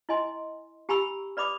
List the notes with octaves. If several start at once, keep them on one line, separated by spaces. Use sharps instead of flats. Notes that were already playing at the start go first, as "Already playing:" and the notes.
E4 D#5 G#5 C6
G4 G#5 A#5 B5 C#6 E6
B4 D5 B5 D6 D#6